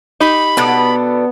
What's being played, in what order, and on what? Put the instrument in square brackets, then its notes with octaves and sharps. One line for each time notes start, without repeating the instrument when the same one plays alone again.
[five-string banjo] D#4 G4 [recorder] B5
[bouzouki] B2 D4 A4 [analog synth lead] B3